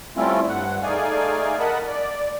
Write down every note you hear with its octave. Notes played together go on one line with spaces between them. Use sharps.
G3 A3 C4 C#4 E4 F4
G2 F#5
A3 D#4 G#4 D5 F5 G#5
A#4 D#5 F#5 A5 B5
D5